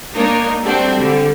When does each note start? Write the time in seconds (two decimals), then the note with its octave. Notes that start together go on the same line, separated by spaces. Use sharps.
0.15 A#3 D4 D#4 A#4 C#5
0.64 G3 A3 C4 D4 F#4
0.97 D3 G3